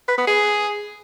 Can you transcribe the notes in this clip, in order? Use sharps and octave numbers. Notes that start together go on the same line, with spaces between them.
B4
B3
G#4